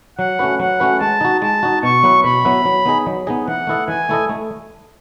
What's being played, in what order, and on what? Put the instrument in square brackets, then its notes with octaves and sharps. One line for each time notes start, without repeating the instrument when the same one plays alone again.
[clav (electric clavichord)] F#3 [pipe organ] F#5
[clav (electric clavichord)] A3 C#4 F#4 B4
[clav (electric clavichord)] F#3 [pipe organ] F#5
[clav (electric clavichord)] A3 C#4 F#4 B4
[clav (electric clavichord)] G#3 [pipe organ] A5
[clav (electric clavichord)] D#4 F#4
[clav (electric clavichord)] G#3 [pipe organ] A5
[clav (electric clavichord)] D#4 F#4
[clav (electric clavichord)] B2 [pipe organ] C#6
[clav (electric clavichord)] F#3 B3 E4 B4
[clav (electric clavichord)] B2 [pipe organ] B5
[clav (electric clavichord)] F#3 B3 E4 B4
F#3
B3 D#4 G#4 D#5
F#3
B3 D#4 G#4 D#5
[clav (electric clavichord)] E3 [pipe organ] F#5
[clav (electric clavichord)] A3 E4 A4 D#5
[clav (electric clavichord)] E3 [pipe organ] G#5
[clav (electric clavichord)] A3 E4 A4 D#5
A3